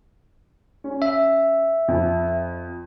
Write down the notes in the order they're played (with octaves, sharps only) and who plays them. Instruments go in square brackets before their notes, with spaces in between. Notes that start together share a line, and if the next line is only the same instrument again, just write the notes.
[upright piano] C#4
[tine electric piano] E5
[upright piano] F2